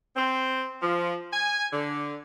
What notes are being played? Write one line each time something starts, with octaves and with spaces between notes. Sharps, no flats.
C4
F3
G#5
D3